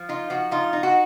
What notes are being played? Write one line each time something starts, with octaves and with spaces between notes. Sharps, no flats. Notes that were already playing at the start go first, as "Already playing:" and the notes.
Already playing: F3
D#4 F4
F3 F#4
D#4 F4
D#4
F#4